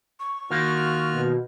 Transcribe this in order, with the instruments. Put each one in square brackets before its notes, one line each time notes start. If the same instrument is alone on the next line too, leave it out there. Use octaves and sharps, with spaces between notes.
[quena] C#6
[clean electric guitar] D#3 A#3 [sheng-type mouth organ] F4 F#4 F6
[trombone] B2